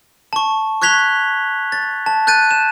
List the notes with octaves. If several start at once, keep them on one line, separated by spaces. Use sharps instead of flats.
A5 C#6
C#6 F#6 G#6 B6 F7 G7
A6
A5
F#6 G6 A6 D#7
E7